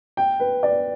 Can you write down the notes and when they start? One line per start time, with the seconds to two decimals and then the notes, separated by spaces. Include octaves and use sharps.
0.17 G5
0.40 B4
0.63 D5